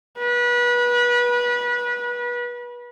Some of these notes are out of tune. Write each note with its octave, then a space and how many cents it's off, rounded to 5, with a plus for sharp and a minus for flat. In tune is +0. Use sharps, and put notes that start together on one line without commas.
B4 -30